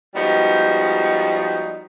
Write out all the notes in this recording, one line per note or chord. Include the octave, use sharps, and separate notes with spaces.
F3 G3 G#3 B3 D#4 F#4